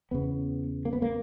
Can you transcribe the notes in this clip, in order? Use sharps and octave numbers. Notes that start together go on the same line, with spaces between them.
E2 C#3 B3
A#3
B3
A#3